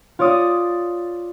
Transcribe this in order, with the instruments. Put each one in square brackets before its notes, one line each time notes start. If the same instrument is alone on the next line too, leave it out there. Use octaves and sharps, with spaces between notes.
[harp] F4 C#5 D5 D#6